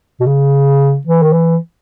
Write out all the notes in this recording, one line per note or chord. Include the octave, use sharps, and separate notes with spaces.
B2
C#3
E3
D#3
E3